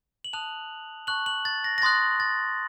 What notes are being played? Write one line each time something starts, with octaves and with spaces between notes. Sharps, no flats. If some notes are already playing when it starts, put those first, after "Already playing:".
F#7
A5 D#6 F#6 F7
A5 C#6 F#6 F#7
F#7
A6
A#6
A#6
C6 D#6 F#6 A6
A6